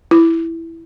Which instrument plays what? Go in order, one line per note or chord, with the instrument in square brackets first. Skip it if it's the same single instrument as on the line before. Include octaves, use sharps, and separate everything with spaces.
[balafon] E4